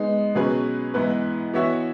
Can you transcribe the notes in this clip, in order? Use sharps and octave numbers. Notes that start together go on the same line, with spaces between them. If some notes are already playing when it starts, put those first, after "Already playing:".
Already playing: G#3 B3 D#4
B2 F#3 C#4 G#4 B4
G#2 E3 B3 E4 B4
E3 B3 F#4 C#5 E5